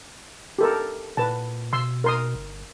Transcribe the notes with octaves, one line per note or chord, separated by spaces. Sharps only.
G4 A4 A#4
A#2 B4 A5
B2 C6 E6
A#4 C6 D#6
G1